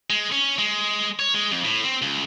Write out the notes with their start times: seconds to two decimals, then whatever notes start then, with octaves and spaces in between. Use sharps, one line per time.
0.10 G#3
0.32 C#4
0.58 G#3
1.19 C#5
1.34 G#3
1.52 F2
1.65 A2
1.84 C4
2.02 C#2